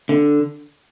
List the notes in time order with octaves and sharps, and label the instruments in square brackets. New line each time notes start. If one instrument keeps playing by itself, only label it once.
[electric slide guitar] D3